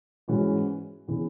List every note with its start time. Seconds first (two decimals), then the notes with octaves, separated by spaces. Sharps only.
0.28 G#2 E3 G#3 C#4 F#4
1.08 C#3 E3 B3